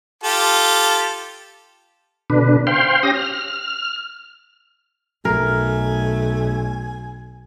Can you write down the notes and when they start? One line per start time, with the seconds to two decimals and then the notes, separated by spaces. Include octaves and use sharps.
0.24 F4 G4 A4
2.30 B2 D3 D4 B4
2.67 C5 F5 G5 C6
3.03 C#4 G4 D#6 A#6
3.15 F6
5.25 B1 A3 A#4 G#5